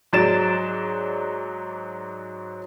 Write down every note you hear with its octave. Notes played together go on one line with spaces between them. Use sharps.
G#2 F#3 D5 A6 D7 E7